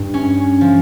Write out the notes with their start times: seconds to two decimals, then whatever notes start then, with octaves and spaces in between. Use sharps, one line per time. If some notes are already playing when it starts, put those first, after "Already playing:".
Already playing: G2
0.14 C#4
0.61 F3